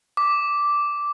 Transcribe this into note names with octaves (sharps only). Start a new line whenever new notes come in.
D6